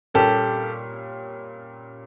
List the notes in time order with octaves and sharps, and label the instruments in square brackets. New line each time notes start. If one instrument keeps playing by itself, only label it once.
[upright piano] A#2 G3 A#3 C#4 [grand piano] G4 A4